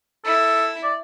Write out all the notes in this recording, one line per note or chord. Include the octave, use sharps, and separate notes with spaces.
E4 A4
D5